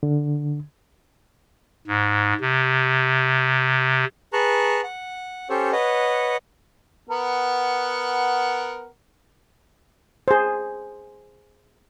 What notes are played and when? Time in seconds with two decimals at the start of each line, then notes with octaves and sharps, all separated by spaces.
0.03 D3
1.87 G#2
2.41 C3
4.33 G#4 B4 A5 A#5 C#6 F#6
4.84 F#5
5.50 C#4 G4 A4 C5 C#5
5.72 B4 C#5 D#5 F#5
7.10 B3 A#4 F#5
10.28 G#4 C5